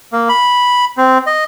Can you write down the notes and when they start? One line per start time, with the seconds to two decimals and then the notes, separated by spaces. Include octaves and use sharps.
0.13 A#3
0.29 B5
0.97 C4
1.27 D#5